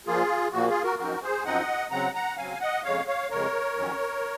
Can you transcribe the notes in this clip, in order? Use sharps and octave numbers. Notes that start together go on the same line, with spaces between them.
A#2 F3 A#3 F4 G#4
A#2 F3 A#3 F#4
F4 G#4
F#4 A#4
F#2 F3 C4 D#4 F#4 A#4
G#4 C5
F#2 F3 C4 D#4 D#5 F#5
C#3 F#3 C4 F#5 A#5
F#5 A#5
C#3 F#3 C4 F5 G#5
D#5 F#5
F2 C#3 G#3 C#5 F5
C#5 F5
F2 C#3 G#3 A#4 C#5
F2 D#3 F#3 C#4